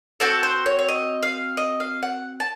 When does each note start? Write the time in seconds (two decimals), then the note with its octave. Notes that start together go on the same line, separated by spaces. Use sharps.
0.20 C4 F#4 A4 A5
0.43 C5
0.66 C#5
0.79 C#5
0.89 D#5
1.23 F5
1.57 D#5
1.80 F5
2.03 F#5
2.40 A5